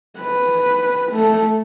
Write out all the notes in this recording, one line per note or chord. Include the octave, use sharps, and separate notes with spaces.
B4
A3